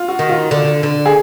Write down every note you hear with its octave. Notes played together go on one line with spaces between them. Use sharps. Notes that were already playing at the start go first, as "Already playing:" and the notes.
Already playing: F4
F#4
D#3
F4
D3
D3
G#4